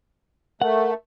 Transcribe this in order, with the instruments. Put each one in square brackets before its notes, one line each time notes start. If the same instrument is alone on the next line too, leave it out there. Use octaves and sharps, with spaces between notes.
[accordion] A3 [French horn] A#4 [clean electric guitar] F#5